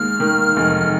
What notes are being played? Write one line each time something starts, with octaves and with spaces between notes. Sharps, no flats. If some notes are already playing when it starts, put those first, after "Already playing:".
Already playing: D#2 G#3 F6
D#3
F1